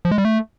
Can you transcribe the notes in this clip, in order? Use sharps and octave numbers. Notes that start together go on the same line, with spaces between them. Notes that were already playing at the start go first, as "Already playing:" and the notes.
F3
G#3
G3
A3